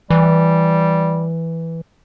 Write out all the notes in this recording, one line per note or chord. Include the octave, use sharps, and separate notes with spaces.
E3 G3